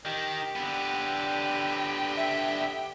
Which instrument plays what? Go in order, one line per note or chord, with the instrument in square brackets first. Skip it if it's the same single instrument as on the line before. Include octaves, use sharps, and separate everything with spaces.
[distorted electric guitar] D#3 [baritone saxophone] G4
[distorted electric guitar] D3 B3
[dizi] E5